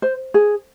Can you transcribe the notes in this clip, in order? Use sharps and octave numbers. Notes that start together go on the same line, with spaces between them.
C5
G#4